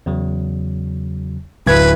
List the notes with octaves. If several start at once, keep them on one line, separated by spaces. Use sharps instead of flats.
E2 C#3 F#3
D1 F#2 B4 G#6